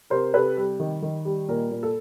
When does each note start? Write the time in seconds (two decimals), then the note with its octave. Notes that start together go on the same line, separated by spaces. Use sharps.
0.10 C3 A#4 C5
0.34 C3 A4 B4
0.57 G3
0.80 D#3
1.02 D#3
1.25 G3
1.48 A#2 A#4
1.71 A#2
1.83 A4